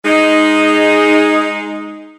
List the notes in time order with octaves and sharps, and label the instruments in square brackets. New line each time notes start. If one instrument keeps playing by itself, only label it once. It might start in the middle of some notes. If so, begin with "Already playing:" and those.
[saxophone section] G#3 D#4